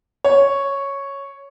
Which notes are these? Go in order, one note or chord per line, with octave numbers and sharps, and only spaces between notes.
C#5